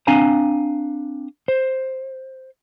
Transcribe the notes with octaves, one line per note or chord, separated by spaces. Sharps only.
C4 D4 F5 G#5 A#5
C5